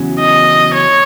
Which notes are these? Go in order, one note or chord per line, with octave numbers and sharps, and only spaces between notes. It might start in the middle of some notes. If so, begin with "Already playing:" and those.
Already playing: E2 C#3 F#3 C#4
D#5
C#5